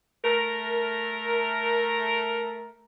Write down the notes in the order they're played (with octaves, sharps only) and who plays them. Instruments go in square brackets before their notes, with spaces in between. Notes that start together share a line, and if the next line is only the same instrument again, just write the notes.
[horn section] A3 A#4